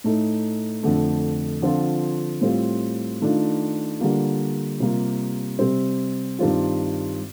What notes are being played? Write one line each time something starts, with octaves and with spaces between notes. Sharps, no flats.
A2 A3 D#4
F2 D3 A3
D3 F3 C4 F4
A2 G3 C4 F4
D#3 A3 D4 F4
D3 G3 A#3 F4
C3 G3 A#3 F4
C3 G3 C4
G2 D#3 G3 C4 F4